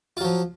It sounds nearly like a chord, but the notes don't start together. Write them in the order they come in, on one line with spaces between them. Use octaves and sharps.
F4 F#3 F3